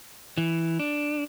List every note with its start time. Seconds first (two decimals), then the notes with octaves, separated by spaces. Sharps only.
0.38 E3
0.79 D4